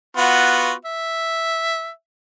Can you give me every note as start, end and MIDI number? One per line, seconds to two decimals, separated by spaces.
0.17 0.72 59
0.17 0.72 65
0.17 0.72 66
0.85 1.90 76